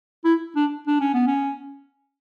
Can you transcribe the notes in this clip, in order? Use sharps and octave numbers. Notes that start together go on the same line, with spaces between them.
E4
D4
D4
C#4
B3
C#4